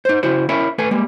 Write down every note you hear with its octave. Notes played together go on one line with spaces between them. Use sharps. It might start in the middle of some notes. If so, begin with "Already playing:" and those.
D#4 C5
C#3 E4 F#4 C5
C#4 E4 A#4 C#5 E5 B5
A3 A4 B4 G#5
G3 G#3 A#3